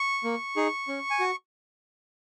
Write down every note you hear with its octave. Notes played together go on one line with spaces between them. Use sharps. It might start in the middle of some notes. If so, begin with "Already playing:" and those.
Already playing: C#6
A#3
D#4 G#4
C#4
G#5
F#4